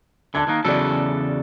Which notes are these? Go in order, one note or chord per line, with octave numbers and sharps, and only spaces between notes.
D3 A5 F#6 G#6
D#3 A#3
E2 C#3 F#3 A4 D5